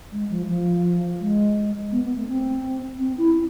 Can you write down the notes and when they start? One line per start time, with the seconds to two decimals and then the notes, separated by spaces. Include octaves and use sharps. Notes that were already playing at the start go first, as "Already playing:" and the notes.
0.12 G#3
0.29 F3
0.48 F3
1.20 G#3
1.92 B3
2.04 B3
2.16 A3
2.28 C4
3.00 C4
3.18 E4